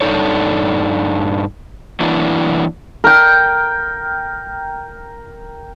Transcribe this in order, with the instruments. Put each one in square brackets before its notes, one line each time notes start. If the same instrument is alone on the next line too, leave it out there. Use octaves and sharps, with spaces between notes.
[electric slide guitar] G2 D4 D#4 A4 C#5
E3 F#3 A#3 D4 E4 F#4
[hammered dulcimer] A#4 G5